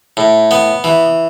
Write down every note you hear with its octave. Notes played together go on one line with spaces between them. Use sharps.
A2
B3
E3